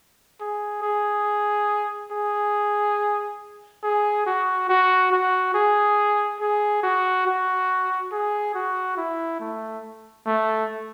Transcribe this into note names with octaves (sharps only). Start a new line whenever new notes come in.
G#4
G#4
G#4
G#4
F#4
F#4
F#4
G#4
G#4
F#4
F#4
G#4
F#4
E4
A3
A3